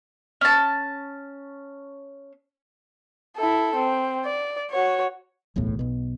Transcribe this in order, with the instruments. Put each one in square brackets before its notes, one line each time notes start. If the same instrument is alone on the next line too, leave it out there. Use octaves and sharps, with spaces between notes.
[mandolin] C#4 A5
[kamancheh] E4 A4
C4
D5
F#4 C#5
[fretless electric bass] D1 B1 E2 A2
B1 B2